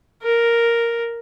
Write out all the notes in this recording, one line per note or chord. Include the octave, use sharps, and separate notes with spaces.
A#4